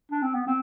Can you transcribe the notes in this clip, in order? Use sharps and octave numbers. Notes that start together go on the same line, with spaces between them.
D4
C4
B3
C4